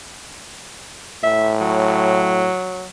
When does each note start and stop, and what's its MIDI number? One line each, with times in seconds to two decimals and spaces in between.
1.23 2.51 45
1.23 1.52 76
1.61 2.87 54